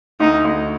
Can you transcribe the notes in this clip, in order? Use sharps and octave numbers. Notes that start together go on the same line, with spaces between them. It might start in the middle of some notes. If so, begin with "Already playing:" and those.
D2 D#4
D2